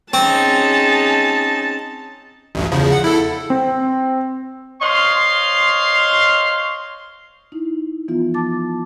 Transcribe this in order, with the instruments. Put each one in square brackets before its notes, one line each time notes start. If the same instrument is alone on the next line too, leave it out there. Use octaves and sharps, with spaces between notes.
[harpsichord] C4 [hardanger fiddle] C#4 D#4 [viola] G#4 A5
[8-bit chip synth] A1 D2 G2
E2 C#3 F3
F#5
E4 A4
[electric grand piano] C4
[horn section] C5 C#5 D#5 F5 C6
[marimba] D#4 E4
E3 F3 B3 F4
A5 D6 A6